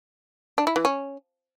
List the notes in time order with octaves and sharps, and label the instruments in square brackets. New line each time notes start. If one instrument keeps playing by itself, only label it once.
[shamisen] D4
E4
E3
C#4